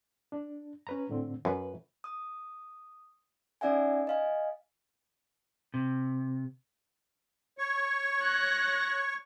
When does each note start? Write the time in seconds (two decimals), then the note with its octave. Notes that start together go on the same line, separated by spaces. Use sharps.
0.32 D4
0.87 C#4 B4 A#5
1.09 A2 D3 C4
1.45 F#2 B4
2.04 D#6
3.61 C#4 D#4 D5 E5 F#5 G#5
4.07 D#5 F5 G#5
5.74 C3
7.58 C#5 C#6
8.21 F#6 A#6